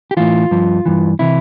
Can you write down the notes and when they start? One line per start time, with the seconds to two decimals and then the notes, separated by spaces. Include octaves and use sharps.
0.11 G4
0.17 A2 E3 F4
0.51 G2 F3
0.86 G2 E3
1.19 C3 E3 E4